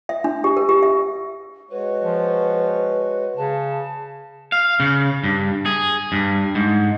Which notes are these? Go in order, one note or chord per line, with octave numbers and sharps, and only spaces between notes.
E5
D4
G4
A#4
G4
E5
G#3 F#4 B4 C#5
F3
C#3 A5
F5
C#3
G2
G#4
G2
G#2